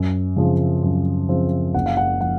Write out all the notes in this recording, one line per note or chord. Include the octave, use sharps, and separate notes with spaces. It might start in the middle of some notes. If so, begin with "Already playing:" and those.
Already playing: F#2
C#3 F3 C4
F#2
C#3 F3 C4
F#1 F#5
F5
F#5
F3 F#5